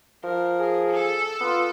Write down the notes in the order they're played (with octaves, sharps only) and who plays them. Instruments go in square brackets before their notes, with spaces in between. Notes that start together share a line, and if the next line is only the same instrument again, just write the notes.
[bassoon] F3 [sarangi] A#4
[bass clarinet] G#4
[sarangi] A4
[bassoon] B3 [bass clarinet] F4